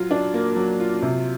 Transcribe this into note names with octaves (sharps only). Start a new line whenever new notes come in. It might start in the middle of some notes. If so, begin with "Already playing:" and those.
Already playing: F#3 F4
D4
A#3
F#3
F4
C3